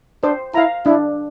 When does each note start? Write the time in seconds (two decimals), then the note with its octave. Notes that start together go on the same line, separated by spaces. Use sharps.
0.23 D4 C5
0.54 E4 F5 A#5
0.86 D4 E4